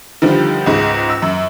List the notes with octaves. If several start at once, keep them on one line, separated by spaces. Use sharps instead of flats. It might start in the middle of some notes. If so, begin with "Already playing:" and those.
D3 D#3 F3 G3
C#2 G#2 G#3
E6
F#2